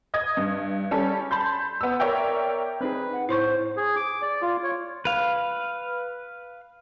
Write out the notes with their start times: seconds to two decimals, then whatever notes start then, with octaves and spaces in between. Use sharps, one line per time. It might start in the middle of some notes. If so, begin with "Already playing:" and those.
0.14 D#5 D#6 G#6
0.37 G2
0.91 G3 C#4 A4
1.31 A5 B5 C6 G6
1.81 B3 E6
2.00 A#4 C#5 D5 E5 G5
2.81 C4 D#4 G#4 B4
3.13 F#5
3.29 A2 E4 C5 C6 C#6
3.77 G#4
3.96 D6
4.22 D5
4.42 F4
4.63 C#5
5.05 B4 F5